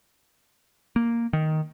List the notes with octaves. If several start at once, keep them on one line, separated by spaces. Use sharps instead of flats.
A#3
D#3